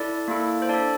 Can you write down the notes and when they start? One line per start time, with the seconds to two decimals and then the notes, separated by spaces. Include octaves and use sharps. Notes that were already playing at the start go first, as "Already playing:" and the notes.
Already playing: E4 A4 D5
0.28 A#3 E4 A4
0.62 C5
0.69 D4 A4 D5